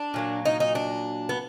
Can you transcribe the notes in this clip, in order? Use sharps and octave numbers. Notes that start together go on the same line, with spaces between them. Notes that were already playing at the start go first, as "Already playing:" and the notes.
Already playing: D4
A#2 F#3 A#3
D#4
D#4
D4
B3